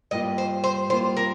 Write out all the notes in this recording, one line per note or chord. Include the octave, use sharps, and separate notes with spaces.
G2 G3 A#3 F4 D#5
C5
C5
G2 G3 A#3 F4 C5
A#4